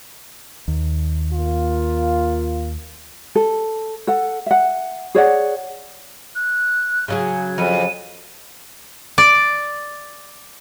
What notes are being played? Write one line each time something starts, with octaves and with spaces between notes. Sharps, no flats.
D#2
A#3 F4
A4
A4 F#5
E5 F#5
G#4 C#5 D5 F#5
F#6
C#3 F#3 G#4 F5
F2 D#7
D5